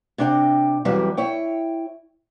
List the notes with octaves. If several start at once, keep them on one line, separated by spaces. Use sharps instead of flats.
C3 D4 G5
F2 E3 F#3 G3
E4 C#5 G5